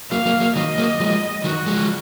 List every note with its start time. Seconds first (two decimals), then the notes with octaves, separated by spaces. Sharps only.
0.11 F#3 A#3 F5
0.26 F#3 A#3
0.40 F#3 A#3
0.56 D#3 F#3 D#5
0.78 F#3 A#3
1.00 F3 G#3
1.44 D#3 F#3 F#4
1.67 F3 G#3